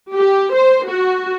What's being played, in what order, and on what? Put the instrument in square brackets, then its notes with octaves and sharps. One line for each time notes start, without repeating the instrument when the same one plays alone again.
[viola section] G4
C5
F#4